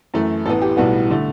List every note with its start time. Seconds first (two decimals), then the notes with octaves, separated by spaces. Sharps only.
0.14 F#2 E3 A3
0.45 A1 A2 E3 B3 A4
0.62 G4
0.77 B1 A2 G3 B3 F#4
1.10 D3 A3